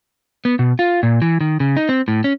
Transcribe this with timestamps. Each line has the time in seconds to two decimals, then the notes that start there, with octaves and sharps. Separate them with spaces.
0.45 B3
0.59 B2
0.79 F4
1.03 A#2
1.22 E3
1.41 D#3
1.60 C#3
1.77 D#4
1.89 C4
2.08 A2
2.24 C#4